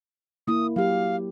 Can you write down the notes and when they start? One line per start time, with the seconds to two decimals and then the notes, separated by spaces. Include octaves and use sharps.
0.48 A#3 E4 D#6
0.76 F#3 G4 F5